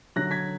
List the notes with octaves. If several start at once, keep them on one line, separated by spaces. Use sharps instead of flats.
D3 F#3 F#6 A#6
G#6 B6